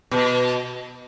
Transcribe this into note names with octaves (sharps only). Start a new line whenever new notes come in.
B2